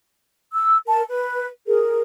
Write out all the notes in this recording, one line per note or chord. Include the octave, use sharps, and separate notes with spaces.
E6
A#4 A5
B4
G#4 A#4